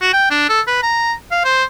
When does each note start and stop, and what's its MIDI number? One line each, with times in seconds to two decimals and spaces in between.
0.02 0.11 66
0.13 0.26 79
0.30 0.48 62
0.49 0.61 69
0.67 0.80 71
0.83 1.13 82
1.31 1.43 77
1.44 1.64 72